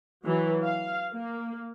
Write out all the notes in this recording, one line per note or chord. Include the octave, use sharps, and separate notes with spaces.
E3 F#3
F5
A#3